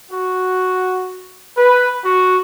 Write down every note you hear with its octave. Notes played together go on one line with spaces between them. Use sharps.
F#4
B4
F#4